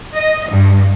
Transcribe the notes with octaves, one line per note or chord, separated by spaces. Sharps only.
D#5
G2